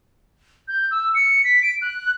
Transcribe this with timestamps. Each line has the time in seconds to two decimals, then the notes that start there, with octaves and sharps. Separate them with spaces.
0.68 G6
0.91 E6
1.15 C#7
1.44 B6
1.62 D7
1.82 F#6